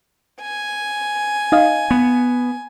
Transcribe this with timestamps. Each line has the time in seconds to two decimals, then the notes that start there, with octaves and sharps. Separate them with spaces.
0.43 G#5
1.52 D#4 D#5 F5
1.91 B3